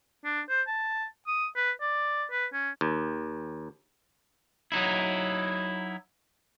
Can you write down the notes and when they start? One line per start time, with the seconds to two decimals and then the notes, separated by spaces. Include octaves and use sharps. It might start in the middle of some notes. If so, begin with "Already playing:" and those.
0.25 D4
0.49 C5
0.68 A5
1.27 D#6
1.56 B4
1.81 D5
2.31 B4
2.53 C#4
2.81 D#2
4.72 F#3 D#4 E4